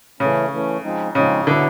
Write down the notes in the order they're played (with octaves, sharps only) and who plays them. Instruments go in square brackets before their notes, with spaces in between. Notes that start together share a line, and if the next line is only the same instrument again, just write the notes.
[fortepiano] C#3 [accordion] E3 A3 C#4
[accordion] E3 A3 C#4
F3 G#3 C4 D#4
[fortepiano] C#3 [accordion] F3 G#3 C4 D#4
[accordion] B2 F#3 B3 E4 [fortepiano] D3